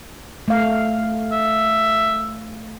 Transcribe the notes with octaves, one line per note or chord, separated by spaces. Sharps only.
A3 F5
E5